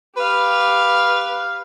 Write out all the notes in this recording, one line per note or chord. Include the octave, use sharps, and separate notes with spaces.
G4 B4 F5